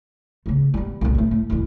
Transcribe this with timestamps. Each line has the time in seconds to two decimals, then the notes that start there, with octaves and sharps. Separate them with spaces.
0.46 C#3 A3
0.74 G3 B3
1.01 B1 A#2
1.15 G2 A3
1.31 A2
1.50 D2 E3